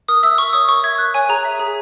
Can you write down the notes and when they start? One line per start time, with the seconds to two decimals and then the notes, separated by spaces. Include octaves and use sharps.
0.08 A#4 D#6
0.23 E5 E6
0.38 A#4 C#6
0.53 C#5 D#6
0.69 A#4 C#6
0.83 E5 G#6
0.98 A#4 F#6
1.14 C#5 G#5
1.29 G#4 A#5
1.45 E5
1.60 G#4